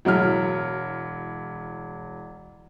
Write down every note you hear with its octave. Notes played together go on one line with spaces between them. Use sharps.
E1 F#3 E4 F6